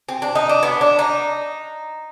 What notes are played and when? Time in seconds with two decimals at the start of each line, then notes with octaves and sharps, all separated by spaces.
0.09 C4
0.22 D4
0.35 D#4
0.49 D4
0.63 B3
0.81 D4
0.99 D#4